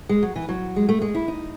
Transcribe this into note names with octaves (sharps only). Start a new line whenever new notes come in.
G#3
F#3
E3
F#3
G#3
A3
G#3
E4
D#4